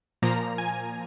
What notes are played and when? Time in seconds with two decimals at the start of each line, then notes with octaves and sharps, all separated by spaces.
0.22 A#2 F3 A#3 A#5
0.58 G#5